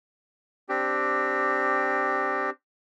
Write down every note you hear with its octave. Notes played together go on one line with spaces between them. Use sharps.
C4 D4 G4